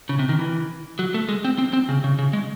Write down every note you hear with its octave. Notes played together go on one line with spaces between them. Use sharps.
C#3
C3
D#3
E3
F#3
A3
G#3
C4
C4
C4
C#3
C#3
C#3
G#3